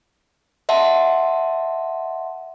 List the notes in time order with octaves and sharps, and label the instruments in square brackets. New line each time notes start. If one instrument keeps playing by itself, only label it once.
[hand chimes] D#5 E5 F#5 A5 C6